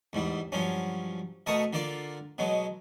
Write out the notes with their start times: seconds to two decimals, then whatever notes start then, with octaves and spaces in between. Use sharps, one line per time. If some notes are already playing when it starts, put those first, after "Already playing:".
0.13 E2 G#2 G3
0.52 G2 F3 F#3 C#4
1.46 B2 A3 A#4 A5 C#6 D#6
1.73 D3 A#3 F4 D5
2.38 B2 F#3 G#3